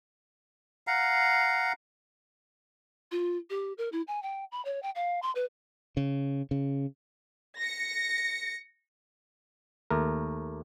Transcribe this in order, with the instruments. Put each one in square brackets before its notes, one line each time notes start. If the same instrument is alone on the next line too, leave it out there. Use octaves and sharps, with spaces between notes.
[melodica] F5 F#5 A#5
[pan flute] F4
G4
A#4
E4
G#5
G5
B5
C#5
G5
F5
C6
B4
[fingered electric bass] C#3
C#3
[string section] A#6 C#7
[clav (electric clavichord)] D#2 A3 A#4